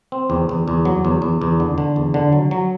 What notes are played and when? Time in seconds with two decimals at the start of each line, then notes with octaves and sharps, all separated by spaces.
0.12 C4
0.30 E2
0.49 E2
0.68 E2
0.85 F#3
1.05 E2
1.22 E2
1.41 E2
1.60 D3
1.78 D3
1.96 E2
2.14 D3
2.33 F#3
2.51 F#3